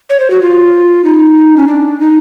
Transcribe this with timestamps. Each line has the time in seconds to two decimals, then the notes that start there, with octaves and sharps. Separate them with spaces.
0.10 C#5
0.20 C5
0.30 F#4
0.42 F4
1.04 D#4
1.57 C#4
1.68 D4
2.00 D#4